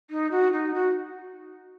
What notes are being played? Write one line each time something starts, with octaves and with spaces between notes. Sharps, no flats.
D#4
F#4
D#4
F#4